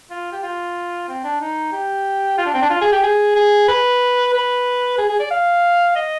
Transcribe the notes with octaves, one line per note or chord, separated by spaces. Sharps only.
F4
G4
F4
C4
D4
D#4
G4
F4
D4
C4
D4
F4
G#4
G4
G#4
G#4
B4
B4
G#4
G#4
D5
F5
D#5